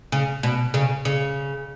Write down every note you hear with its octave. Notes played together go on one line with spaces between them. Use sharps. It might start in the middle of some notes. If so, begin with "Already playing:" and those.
C#3
B2
C#3
C#3